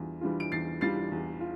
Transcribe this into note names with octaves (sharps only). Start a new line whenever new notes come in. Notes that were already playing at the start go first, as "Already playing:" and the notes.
Already playing: E2 E3 G3 D4 F4
E3 G3 D4 F4
D7
E2 A6 C7
E3 G3 D4 F4 A6 C7
E2
F4